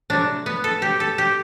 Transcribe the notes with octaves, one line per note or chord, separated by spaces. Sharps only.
C3 F#3 A3 D4
B3
A4
G4
A4
G4